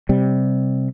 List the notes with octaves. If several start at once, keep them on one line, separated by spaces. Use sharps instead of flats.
C3 G3